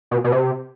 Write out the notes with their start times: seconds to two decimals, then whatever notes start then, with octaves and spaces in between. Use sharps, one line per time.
0.11 B2
0.24 B2
0.32 C3